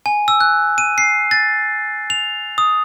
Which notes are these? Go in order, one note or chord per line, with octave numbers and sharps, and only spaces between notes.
G#5
E6
F#6
D#7
C7
A6
F7
D#6